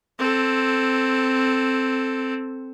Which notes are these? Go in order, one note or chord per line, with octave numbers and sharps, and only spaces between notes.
C4 A4